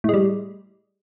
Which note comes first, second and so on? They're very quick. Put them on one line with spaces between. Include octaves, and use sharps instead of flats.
A2 G#3 G3